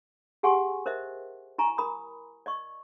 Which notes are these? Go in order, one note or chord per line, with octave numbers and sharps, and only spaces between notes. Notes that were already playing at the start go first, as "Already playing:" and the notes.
G4 G#4 F#5 G#5 C6 C#6
A#4 C5 D#5 E5
E4 G#5 A#5 C#6
A#4 B5 D#6
D5 D#5 C#6